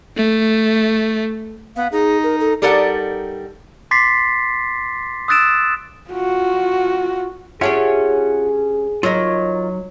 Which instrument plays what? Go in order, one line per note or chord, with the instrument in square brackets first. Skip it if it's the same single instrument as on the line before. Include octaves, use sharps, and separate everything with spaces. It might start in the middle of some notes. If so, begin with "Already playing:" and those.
[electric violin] A3
[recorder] B3 [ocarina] F5
[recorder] D#4 [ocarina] G#4
[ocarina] A#4
A4
[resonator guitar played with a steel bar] G3 D#4 A4 A#4 D5 F#5
[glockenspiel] C6 D6 A6 B6 C7
D#6 E6 F#6 A6 D7 E7
[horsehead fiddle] F4 F#4
[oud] C#4 D4 G4 [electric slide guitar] F4 E5 F#5 [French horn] G#4
[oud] F#3 D#4 [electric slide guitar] F4 A#4 D#5